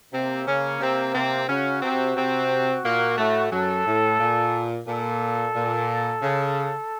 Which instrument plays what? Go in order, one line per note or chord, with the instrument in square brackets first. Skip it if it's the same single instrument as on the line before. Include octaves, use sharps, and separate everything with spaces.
[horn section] C3 C4 [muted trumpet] A#3
[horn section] C#3 C#4
C3 C4
C3 C4
[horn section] C#3 C#4 [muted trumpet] F#4
[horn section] C3 C4
C3 C4
A#2 A#3
A2 A3
[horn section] F#2 F#3 [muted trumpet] A4
[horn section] A2
A#2
[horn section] A#2 [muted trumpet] A4
[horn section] A#2
C#3